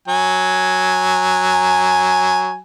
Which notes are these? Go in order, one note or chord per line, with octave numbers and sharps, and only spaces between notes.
F#3 G#5